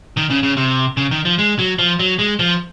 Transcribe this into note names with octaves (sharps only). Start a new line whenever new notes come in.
D#3
C#3
C#3
C3
C#3
D#3
F3
G#3
F#3
F3
F#3
G#3
F3